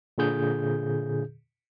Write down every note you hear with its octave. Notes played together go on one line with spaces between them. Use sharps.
A#2 D3 G#4 G6